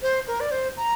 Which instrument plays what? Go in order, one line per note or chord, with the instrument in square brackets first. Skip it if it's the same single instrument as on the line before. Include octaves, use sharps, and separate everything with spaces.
[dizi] C5
A#4
D5
C5
A#5